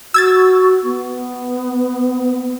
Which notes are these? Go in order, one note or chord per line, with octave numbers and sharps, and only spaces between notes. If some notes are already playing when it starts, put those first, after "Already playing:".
F#4 E6 G#6 A6
B3